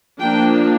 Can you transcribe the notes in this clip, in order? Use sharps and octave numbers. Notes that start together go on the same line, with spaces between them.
F3 A#3 D4 G5